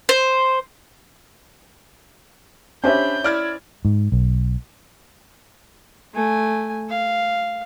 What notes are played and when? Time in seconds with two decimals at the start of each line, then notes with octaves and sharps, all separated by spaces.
0.09 C5
2.84 C#4 D4 G4 C5 E5 B5 G6
3.24 E4 D5 F6 G#6
3.85 G#2
4.12 B1
6.14 A3 G#5
6.90 F5